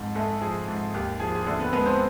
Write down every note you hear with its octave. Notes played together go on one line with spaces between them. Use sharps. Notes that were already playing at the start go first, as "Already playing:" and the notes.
Already playing: F2 G#2
G#3 A3 A4
F3 G#4
G#2
D#2 G4
F3 G#4
G#4
D3 A3 A4
B3 B4
G#3 B3 B4
C4 C5